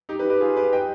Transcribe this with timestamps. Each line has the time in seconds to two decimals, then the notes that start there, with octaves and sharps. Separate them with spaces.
0.09 D#4 G4
0.19 G4 B4
0.30 G4 B4
0.40 F4 G#4
0.56 G4 B4
0.72 D#5 G5